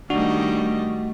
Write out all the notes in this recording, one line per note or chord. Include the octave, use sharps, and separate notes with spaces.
D#3 G3 A3 D4 F#4 D#5